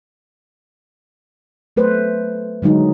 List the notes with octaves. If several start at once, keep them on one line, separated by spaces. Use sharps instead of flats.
F#3 A3 B4 C5
D3 F#3 G#3 D#4